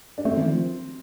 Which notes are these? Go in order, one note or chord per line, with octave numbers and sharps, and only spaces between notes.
D4
A3 C4
D#3
F3